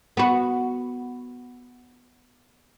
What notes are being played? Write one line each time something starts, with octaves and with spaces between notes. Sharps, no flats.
B3 F#4